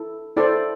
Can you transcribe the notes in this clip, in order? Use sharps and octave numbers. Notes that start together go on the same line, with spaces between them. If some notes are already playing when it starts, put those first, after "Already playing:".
Already playing: E4 A4
E4 A4 C5 D5